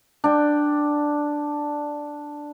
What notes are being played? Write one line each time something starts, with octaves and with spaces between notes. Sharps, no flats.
D4 G5